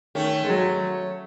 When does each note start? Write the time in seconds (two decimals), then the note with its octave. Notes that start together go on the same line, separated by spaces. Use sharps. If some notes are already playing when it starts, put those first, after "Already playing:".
0.15 D#3 A3 C#4
0.44 G#3
0.50 F#3